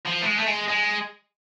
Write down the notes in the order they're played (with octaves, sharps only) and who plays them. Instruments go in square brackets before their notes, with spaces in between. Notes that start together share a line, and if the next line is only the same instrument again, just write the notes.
[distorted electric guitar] F3
A3
G#3
A3
G#3
G#3